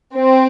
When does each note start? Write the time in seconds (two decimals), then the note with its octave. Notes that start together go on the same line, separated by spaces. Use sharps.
0.16 C4